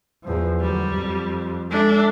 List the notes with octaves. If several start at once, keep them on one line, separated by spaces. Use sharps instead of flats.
E2 F3
D2 F#3 G3
F2
G#3 D4 A4 E5